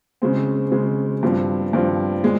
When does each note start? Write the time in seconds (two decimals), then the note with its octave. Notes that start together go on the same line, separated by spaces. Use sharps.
0.22 C#3 G#3 C4
0.72 C#3 G#3 C4
1.23 G2 F3 C4
1.73 G2 F3 C4
2.23 A#2 G#3